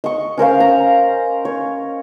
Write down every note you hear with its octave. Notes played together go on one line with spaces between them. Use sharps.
D#5 C#6
C#4 A#4 C5 F5
A#5
C#5